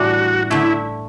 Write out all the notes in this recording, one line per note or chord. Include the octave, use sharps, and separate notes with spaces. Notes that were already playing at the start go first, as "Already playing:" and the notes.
Already playing: A2 E3 G3 D4 F#4
D3 A3 E4